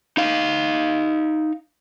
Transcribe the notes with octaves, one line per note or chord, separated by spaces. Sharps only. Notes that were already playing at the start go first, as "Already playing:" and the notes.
D#4 F5